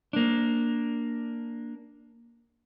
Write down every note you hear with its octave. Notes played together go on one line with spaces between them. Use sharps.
A#3 D4